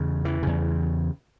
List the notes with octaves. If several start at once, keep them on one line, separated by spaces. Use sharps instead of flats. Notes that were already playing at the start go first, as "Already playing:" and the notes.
Already playing: E2 C#3
E3
E2 C#3